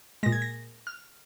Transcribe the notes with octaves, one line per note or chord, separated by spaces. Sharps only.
A#2 G#3 A#6
G#6
A#6
F6